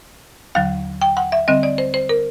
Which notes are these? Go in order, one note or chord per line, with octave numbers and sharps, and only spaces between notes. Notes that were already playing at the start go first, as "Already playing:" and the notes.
D#2 D3 F#3 F5
G5
F#5
E5
D3 G3 C4 D#5
D5
C5
C5
A#4